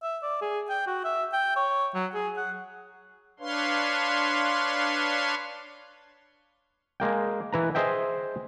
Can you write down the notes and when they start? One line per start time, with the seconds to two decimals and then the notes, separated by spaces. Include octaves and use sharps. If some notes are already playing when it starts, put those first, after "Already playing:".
0.03 E5
0.23 D5
0.42 G#4
0.70 G5
0.87 F#4
1.04 E5
1.33 G5
1.56 C#5
1.94 F#3
2.14 G#4
2.37 F#5
3.40 D4 B4 C#5 F5 C6
7.00 G#3 A#3 G5
7.53 E3 B4 A#5
7.75 G#4 C5 D#5 E5 G5